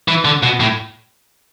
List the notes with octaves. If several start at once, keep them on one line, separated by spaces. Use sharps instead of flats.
E3
D3
B2
A2